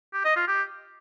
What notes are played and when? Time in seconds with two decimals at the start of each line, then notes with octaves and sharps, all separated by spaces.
0.13 G4
0.25 D#5
0.36 F4
0.48 G4